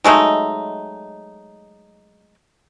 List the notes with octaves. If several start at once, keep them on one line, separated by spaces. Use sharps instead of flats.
F#3 G#3 A3 D#4